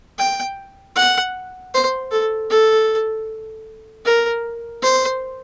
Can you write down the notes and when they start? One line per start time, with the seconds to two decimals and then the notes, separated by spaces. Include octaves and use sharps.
0.19 G5
0.96 F#5
1.74 C5
2.11 A4
2.50 A4
4.05 A#4
4.83 C5